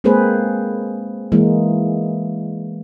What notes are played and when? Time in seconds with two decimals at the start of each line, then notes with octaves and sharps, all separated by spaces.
0.04 G#3 A#3 C4 G#4 B4 C5
1.32 E3 G#3 A#3